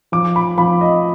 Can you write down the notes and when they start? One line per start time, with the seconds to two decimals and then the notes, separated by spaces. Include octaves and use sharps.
0.12 F3 D6
0.36 B5
0.57 F3 B5
0.81 D#5